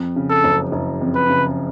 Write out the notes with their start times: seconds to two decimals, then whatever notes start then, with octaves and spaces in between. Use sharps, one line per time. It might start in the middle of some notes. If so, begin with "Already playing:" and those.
Already playing: F2
0.16 C#3
0.30 A4
0.44 F#1
0.72 F#1
1.02 F2
1.15 B4
1.29 C#3